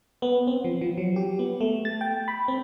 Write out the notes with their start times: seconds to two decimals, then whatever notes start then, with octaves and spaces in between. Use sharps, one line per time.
0.22 B3
0.47 C4
0.64 F3
0.81 F3
0.97 F#3
1.16 G4
1.39 B3
1.61 A3
1.85 A6
2.01 G5
2.28 B5
2.48 C4